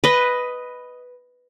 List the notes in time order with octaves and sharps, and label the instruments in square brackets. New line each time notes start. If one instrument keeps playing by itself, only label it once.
[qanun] B4 D#5